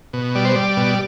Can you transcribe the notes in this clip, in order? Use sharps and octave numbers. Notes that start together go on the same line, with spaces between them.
B2
G3 D5
C5
G3 D5
B2